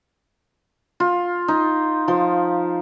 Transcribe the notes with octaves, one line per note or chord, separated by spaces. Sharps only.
F4
D#4
F3